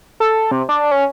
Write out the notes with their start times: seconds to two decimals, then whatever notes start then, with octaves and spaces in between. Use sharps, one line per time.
0.20 A4
0.51 C3
0.69 D4
0.91 C#4